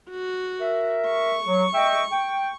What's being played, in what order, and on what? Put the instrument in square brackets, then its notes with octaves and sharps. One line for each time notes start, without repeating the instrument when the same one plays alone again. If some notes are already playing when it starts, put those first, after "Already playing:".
[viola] F#4
[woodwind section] A#4 E5
[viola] C#6
[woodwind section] F#3
D#5 E5 G5
G5